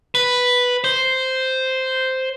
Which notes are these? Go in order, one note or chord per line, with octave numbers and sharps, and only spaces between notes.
B4
C5